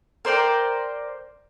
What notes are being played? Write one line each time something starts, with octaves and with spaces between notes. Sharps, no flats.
A#4 C5 D5 G5